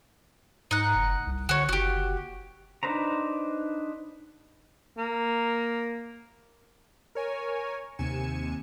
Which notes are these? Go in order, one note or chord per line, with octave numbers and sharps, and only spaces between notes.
G#2 D#4 F#5
F#1
C2
D3 F#4 C#5
F#1 F#4 G4
D4 D#4 B4 C5 A#5
A#3
A#4 C#5 G#5
D#2 C3 G#5 C#7 E7